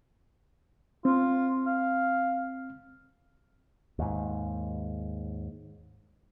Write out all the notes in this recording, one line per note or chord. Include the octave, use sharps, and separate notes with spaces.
C4 F4
F5
D#2 G#2